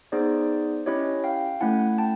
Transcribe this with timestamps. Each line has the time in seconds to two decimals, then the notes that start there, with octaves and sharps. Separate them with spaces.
0.12 B3 D#4 G#4 C5 D5
0.86 C#4 E4 G4 C#5 D#5
1.24 F5 G5
1.61 A3 C#4 E4 F#5 G#5
1.98 G5 A5